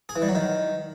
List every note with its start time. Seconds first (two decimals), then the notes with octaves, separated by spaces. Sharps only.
0.09 G#4
0.16 E3
0.22 G3
0.29 F#3
0.35 D#3